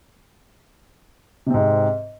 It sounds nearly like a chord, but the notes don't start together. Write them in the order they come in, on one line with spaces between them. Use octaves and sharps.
C3 C4 G#2